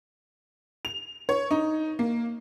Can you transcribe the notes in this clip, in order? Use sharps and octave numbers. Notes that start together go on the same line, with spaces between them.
F7
C#5
D#4
A#3